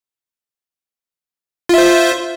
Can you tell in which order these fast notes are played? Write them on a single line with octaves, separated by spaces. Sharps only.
F4 E5 C5